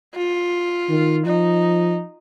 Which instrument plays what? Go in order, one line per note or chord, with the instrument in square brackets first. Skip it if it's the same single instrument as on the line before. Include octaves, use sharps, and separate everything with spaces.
[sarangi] F4
[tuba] D#3
[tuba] F3 [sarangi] D#4